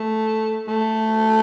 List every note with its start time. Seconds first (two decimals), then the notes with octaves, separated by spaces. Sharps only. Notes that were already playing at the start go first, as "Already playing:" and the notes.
Already playing: A3
0.67 A3